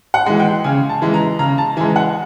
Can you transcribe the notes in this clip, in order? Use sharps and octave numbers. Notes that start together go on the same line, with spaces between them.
F#5
E3 G#3
G5
C#3 G#5
A5
E3 G#3
A#5
C#3 A#5
A5
E3 G#3 G#5
F#5